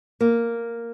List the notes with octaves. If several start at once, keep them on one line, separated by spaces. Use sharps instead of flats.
A#3